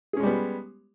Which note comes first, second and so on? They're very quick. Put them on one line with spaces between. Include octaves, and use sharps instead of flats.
G#4 C#4 G#3 G3 B3